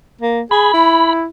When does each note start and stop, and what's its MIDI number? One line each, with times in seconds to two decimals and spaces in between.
0.21 0.41 58
0.51 0.71 68
0.51 1.13 83
0.74 1.25 64